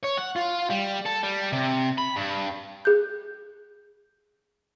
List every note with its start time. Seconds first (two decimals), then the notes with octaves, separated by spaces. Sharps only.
0.04 C#5
0.18 F#5
0.36 F4
0.70 G3
1.05 A4
1.23 G3
1.53 C3
1.98 B5
2.16 G2
2.85 G#4 F#6 G6